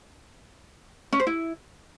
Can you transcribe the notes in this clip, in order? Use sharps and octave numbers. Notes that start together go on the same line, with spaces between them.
C#4
C5
E4